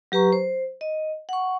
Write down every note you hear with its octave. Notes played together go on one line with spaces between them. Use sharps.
F#3 G4 B4 A#5 C#6
C5
D#5
F#5 C#6